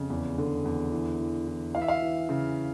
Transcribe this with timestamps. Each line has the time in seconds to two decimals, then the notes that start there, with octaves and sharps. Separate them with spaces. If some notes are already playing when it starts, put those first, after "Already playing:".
Already playing: F2 C#3
0.10 E2
0.38 D3
0.65 E2
0.92 E3
1.20 E3
1.47 E3
1.75 E3 F5
1.81 E5
1.88 F5
2.02 E3
2.29 C#3